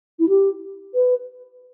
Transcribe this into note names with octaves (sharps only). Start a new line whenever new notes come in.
E4
G4
B4